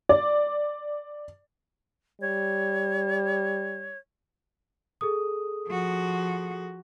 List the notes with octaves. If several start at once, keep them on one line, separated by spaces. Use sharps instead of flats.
D5
G3 C#5
G#4 A4 D#6
F3 F#4